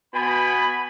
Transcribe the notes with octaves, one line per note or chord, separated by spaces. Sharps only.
B2 B3 G#5 B5